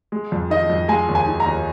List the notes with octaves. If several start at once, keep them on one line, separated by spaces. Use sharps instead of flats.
G#3
F2
D#3 D#5
F2
G#3 G#5
D#2
G#5
D#3
A#5
D#2